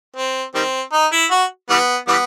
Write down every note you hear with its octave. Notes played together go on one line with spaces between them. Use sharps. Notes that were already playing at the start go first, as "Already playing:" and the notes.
C4
D#3 G3 C4
D#4
E4
F#4
E3 G3 B3
E3 G3 B3